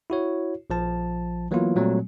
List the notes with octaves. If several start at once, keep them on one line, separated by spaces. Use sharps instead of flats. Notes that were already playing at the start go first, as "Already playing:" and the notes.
E4 F#4 C#5
A#1 F3 A5
E3 F#3 A#3 B3 E4 F4
A#2 F#3 G3 A3 C4